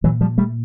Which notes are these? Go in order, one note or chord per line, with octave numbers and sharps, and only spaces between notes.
A#2 E3 F#3
F3 G3
G3 A3